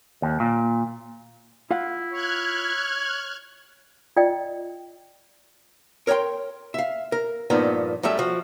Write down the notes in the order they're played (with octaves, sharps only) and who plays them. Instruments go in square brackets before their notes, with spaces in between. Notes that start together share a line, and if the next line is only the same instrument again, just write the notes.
[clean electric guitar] D#2
A#2
[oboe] E4 [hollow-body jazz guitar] F4 F5 F#5
[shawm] C#5 [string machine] F6 F#6 G#6
[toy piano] F4 D5 D#5 G5
[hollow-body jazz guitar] A#4 C#5 D5 G5 C6
E5 F5
A#4
G2 A#2 F3 B3 D#4
F#2 G3 A3 E5
F3 F#4